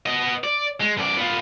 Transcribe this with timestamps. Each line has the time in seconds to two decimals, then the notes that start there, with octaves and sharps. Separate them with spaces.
0.06 B3 D#5
0.44 D5
0.80 G#3
0.97 F#2 D5
1.16 B3 F4